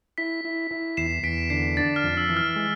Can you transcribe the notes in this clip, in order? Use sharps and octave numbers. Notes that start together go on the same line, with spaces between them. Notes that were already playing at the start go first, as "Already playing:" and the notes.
E4 B6
E4
E4
E2 C7 E7
E2 B6 D7
D3 C7
D4 A6
F6
F2
E6
E3
F6
G#3